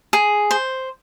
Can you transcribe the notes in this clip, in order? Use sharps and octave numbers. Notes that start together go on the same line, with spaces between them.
G#4
C5